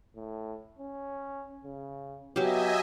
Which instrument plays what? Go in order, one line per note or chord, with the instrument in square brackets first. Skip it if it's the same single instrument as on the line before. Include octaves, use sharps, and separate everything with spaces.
[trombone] A2
C#4
C#3
[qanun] F#3 G4 [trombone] B3 [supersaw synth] D#5 E5 G#5